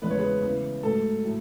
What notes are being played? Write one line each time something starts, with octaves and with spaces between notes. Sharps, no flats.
E2 C#3 G#3 B3 B4
C#5
G#4 B4
C#3 E3 B3
G#2 F#3 A3 A4
A2 F#3